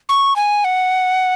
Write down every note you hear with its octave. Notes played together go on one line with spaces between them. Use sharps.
C#6
G#5
F#5